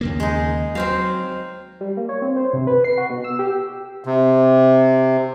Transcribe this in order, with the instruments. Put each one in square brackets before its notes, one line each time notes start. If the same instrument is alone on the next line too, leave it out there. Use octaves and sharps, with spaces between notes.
[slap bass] D#2 C#3 A#3
[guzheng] G#3 D#4
[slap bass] F#3 [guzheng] C4 C5 F5
[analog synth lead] G3
A#3
C#5
C4
C5
C3
B4
C7
F#4
B2
E6
G4
[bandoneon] C3